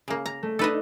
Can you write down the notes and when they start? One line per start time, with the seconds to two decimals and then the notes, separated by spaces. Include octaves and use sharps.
0.08 C#3 A#3
0.26 A#5
0.43 A3
0.59 D4 D#4 A4 B4 D#5